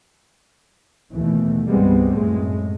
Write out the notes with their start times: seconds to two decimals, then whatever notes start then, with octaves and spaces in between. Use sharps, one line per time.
1.13 D#2 B2 E3 A3
1.68 C2 G2 G3 G#3 B3 C4
2.11 F#2 A2 G#3 A3